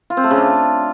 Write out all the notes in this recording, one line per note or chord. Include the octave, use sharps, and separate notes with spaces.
F4
C4
A3
C#3
D4